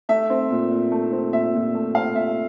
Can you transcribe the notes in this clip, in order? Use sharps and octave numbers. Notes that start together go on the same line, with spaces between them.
A3 E5
C4
A#2
A#2
A3
C4
A#2 E5
A#2
A3
C4 F5
A#2 E5